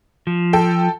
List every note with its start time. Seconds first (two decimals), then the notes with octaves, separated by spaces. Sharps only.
0.27 F3
0.53 A4 G5